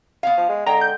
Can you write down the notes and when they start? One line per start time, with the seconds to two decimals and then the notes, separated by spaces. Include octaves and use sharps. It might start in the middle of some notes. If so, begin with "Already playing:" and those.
0.23 B3 C#5 F5
0.38 F3
0.49 G#3
0.66 D3 G#3 G5 A#5
0.81 G6